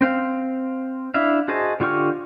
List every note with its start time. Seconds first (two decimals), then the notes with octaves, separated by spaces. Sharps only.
0.01 C4 C5 F5
1.14 D4 E4 E5 F5
1.48 F#4 G#4 C5 D#5 A5
1.80 D3 F4 G4 C#6 F6